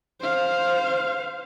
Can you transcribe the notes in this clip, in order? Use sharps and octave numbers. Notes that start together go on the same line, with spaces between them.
C5 F5